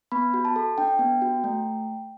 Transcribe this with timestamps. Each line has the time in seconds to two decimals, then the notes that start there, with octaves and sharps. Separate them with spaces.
0.12 B3 B5
0.34 F#4
0.45 A5
0.56 A4
0.78 D4 G5
0.99 B3
1.22 F#4
1.44 A3